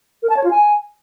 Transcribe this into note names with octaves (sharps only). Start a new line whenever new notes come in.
A#4
A5
C#5
F4
G#5